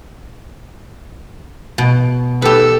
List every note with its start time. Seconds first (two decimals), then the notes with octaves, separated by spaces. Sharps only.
1.78 B2
2.42 G4 A4 B4 E6